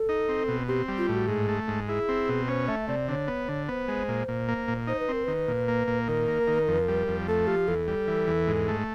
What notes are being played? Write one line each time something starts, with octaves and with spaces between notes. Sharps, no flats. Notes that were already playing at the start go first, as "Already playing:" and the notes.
Already playing: A4
D#4
C4
B2
C4 G4
G3
F4
A2 F#4
G#2 G#4
A3
G#2
E4 G#4
C4
B2
C#4 C5
A3 E5
C3 D5
D3 C#5 D5
B3
D3
B3 C5
G#3
A#2
A#2
A#3
A#2
D#4 C5
B4
C4 A#4
D#3 B4
A#2
A#3
A#2
D#3 A#4
A#3
D#3
F2
G3
F2
A3 A4
F3 G4
E2 A4
G3
E3
E2
G#2
A3